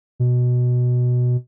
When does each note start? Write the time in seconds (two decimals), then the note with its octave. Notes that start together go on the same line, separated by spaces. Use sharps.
0.20 B2